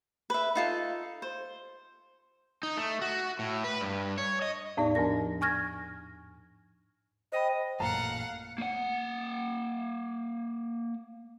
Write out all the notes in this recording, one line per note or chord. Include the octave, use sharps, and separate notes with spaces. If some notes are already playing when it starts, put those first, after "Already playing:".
B4 E5
D#4 F4 A4
C5
D#4
A3
F#4
A2
B4
G2
C#5
D#5
E2 A2 B3 D#4 D5
G#2 F3 D4 A#4 A#6
G#5 C#6 F6 G#6 A#6
C5 D#5 G5 B5
A1 F#2 A#2 F5 F#5 A5 A#5
A#3 F#5